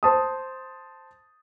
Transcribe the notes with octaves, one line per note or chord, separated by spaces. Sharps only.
C5 A5 D#6